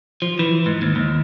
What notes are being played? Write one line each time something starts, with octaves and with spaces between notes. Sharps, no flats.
F3
E3
G#2
D#2
D#2